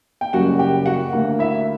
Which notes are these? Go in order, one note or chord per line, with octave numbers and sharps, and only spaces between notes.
G5
F#1 F#2 C#3 G3 F#4 F#5
G4 G5
F#4 F#5
D2 D3 A#3
E4 E5